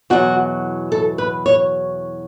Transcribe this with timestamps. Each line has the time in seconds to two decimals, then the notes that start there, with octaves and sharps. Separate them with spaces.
0.10 E2 B2 F#3 F#4
0.92 A4
1.18 B4
1.46 C#5